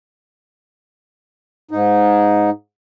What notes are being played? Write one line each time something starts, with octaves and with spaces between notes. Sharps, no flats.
G#2 D#4